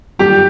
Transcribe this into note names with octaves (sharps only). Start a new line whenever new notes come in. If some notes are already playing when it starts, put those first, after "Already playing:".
G1 F#2 D#3 G3 G4